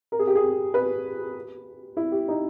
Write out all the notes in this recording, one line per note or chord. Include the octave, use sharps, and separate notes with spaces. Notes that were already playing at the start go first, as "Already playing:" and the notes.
A#4
G#4
G4
G#4
B4
E4
G4
D#4